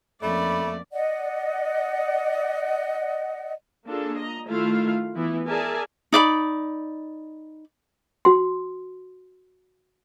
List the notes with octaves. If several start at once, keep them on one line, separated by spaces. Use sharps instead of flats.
F2 A3 A#3 C#4 D5 B5
D5 D#5 F#5
A#3 D4 F4 G#4 A4
D#5 A#5
D#3 A3 E4 F4 F5
E3 B3 E4
G#4 A#4 D5 E5 G#5 A5
D#4 D5 E5 B5
F#4 C6